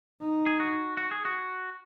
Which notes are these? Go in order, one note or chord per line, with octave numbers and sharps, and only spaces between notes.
D#4
G#4
F#4
F#4
G#4
F#4